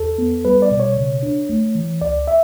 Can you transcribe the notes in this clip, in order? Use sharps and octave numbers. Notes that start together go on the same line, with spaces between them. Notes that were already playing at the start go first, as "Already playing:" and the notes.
Already playing: E2 A4
B3
G3 B4
D5
B2
C#5
C#3
D4
A3
E3
C#2 D5
E5